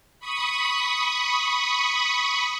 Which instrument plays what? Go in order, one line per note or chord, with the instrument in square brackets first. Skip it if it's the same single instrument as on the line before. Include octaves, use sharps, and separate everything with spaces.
[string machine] B5 C#6 D#6